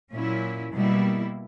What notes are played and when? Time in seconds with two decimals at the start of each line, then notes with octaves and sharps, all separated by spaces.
0.13 A#2 F#3 C#4 E4
0.73 B2 G3 A#3 E4